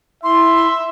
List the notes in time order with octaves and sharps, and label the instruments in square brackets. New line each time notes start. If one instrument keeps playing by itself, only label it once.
[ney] E4 [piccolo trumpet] E5 [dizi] C6